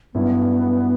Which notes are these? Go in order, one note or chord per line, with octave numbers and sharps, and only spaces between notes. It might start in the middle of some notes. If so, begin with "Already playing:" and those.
G2 F#3 B3 C#4 E4